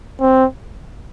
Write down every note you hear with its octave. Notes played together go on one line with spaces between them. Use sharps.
C4